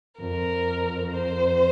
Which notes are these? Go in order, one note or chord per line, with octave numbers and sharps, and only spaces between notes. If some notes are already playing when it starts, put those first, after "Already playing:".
F2 A#4
C5